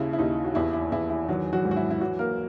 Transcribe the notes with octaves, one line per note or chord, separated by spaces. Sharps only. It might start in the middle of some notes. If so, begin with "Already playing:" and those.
Already playing: D#2 C#3 E4
E4
D#2 D#4
F#4
E2 E4
E4
E2 E4
E4
D#3 F#3 F#4
F#3 F#4
G#2
F#4
E4
E4
E3 F#3 F#4
A#3 A#4